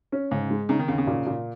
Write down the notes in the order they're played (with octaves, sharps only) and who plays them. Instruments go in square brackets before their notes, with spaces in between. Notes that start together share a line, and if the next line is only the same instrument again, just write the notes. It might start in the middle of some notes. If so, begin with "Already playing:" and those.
[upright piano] C#4
[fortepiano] G#2 [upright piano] C#3
[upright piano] G#3
[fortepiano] C#3 [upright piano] D#4
[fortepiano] D#3
[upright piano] D#2 [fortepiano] C#3
[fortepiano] C#3
[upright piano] A#2
A#2